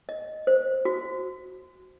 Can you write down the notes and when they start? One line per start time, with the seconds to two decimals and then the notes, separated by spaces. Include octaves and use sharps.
0.09 D#5
0.47 C5
0.85 F#4